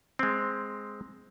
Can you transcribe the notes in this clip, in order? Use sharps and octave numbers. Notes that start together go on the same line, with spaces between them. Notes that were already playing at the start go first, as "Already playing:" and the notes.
G#3 C4